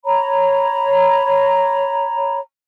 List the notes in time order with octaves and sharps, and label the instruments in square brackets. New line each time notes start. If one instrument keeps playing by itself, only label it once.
[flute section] C#5 A#5 B5